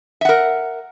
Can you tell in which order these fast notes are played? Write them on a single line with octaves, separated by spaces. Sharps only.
E5 F#5 A#4